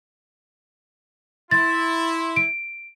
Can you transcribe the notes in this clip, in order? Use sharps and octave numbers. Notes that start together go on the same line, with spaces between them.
E4 C6 A6
D7